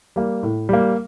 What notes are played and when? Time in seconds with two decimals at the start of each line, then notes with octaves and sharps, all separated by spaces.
0.16 G3 A#3
0.43 A2
0.69 G3 A#3